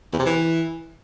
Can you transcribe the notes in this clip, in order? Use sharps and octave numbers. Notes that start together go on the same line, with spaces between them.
E2
C3
E3